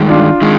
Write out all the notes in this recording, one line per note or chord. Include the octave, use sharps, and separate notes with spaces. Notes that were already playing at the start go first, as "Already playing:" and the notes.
Already playing: G2 D#3 G#3
D4 F4
D#3 G#3